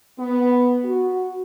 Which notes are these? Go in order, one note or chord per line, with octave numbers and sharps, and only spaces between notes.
B3
F#4